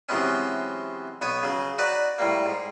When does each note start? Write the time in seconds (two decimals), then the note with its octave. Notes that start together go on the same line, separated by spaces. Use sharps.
0.09 C3 E3 F#3 G#3 B3 C#4
1.21 B1 B3 C#5 D#6
1.43 C#3 F#3
1.78 D#4 F#4 B4 D5
2.18 A2 G3 A#3
2.46 G#2